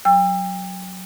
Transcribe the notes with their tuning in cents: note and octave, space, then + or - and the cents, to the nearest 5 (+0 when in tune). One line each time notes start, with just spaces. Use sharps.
F#3 +0 G5 +35 E6 +25